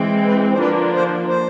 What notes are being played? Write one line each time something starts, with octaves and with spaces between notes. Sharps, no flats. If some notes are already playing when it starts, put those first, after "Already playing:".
Already playing: E3 G#3 C4
B4
C5
D3 F3 A#3 D4 F4 B4
C5
C5